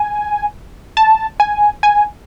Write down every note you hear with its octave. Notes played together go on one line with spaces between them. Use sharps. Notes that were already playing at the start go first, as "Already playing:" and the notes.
Already playing: G#5
A5
G#5
G#5